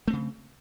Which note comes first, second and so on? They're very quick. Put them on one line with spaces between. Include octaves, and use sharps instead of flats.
A3 C4 C#3